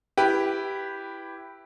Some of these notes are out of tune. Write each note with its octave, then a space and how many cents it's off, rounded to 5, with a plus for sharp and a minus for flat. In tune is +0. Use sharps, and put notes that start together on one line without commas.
E4 +5 G4 +0 B4 +0